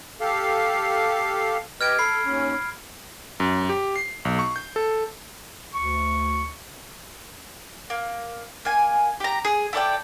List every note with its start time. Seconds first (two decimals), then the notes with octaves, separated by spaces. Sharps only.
0.21 G4 A4 F5
1.81 G4 B4 D#5 F6 G#6 D7
1.99 A4 B5 C7
2.26 D#2 C#4
3.40 F#2
3.69 G4
3.96 C7
4.25 B1
4.39 C#6
4.56 G6
4.76 A4
5.74 D2 C#6
7.90 A#3
8.65 A#3 G#5
9.20 G4 A#5
9.45 G#4
9.73 E4 A4 D5 G5